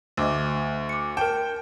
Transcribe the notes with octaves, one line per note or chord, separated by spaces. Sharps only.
D2 D#5 D6 E6
D6 C#7
A#4 G5 A5 E7